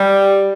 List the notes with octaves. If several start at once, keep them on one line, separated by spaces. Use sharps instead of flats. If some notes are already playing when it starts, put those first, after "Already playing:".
Already playing: G3